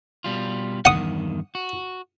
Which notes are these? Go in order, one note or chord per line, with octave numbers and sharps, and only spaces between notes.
B2 G3 F4
E2 G2 D#3 F#5 D#6
F#4